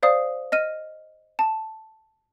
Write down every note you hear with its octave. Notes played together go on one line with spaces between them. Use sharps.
C5 D5 F5 D#6
D#5 F6 D#7
A5